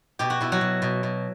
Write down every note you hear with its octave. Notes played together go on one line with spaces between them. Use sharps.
B2 G4
F#4
B2 E4
F#3 F#4
B2
B2
B2